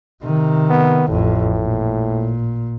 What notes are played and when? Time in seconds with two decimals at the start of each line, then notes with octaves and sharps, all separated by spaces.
0.23 C3 D#3
0.70 B3
1.08 A1 F2 A2
1.58 A#2